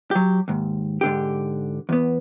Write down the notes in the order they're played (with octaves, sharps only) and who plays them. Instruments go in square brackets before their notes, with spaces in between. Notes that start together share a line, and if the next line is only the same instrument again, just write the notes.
[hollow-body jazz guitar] F#3 G4
D#2 G#2
G#2 D3 G4
E2 B3